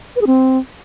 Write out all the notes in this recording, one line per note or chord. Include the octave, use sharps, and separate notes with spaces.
B4
G#4
C4